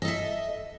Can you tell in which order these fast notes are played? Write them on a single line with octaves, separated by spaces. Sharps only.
D#5 A4 E5